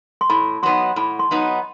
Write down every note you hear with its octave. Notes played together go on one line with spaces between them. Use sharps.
C6
A2 B5
F#3 B3 D#4 C6
A2 B5
C6
F#3 B3 D#4